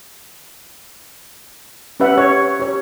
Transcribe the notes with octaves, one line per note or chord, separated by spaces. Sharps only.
C#4 G4 B4 E5 F#5
C#5
G4 C#5